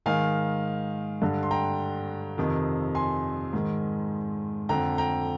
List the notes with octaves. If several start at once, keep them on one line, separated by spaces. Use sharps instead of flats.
G#2 D#3 F5 G#5
G2 D3
C6
G5 A#5
F2 C3 D#3
G#5 C6
G#2 D#3
F2 D3 G5 A#5
G5 A#5